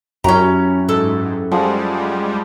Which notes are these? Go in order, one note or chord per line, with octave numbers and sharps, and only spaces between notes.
F#2 C#4 E4 F#4 G4 A#5
G#2 A4
F3 G3 G#3 G#4 F#5